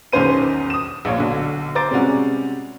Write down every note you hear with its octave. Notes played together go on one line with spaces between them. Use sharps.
B1 E2 D#3 C#4 C5 D#7
D#6 E7
A#1 A#2 C#5 F5
B1 D3
C5 A#5 D6 A6 D7
C3 G3 G#3 C#4 F#4